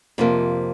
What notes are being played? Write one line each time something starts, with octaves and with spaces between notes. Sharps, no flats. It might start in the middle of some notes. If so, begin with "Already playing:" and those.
F2 C3 F3 A#3